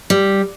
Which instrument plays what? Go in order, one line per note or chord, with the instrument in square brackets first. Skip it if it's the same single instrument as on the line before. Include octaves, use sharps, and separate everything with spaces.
[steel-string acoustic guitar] G3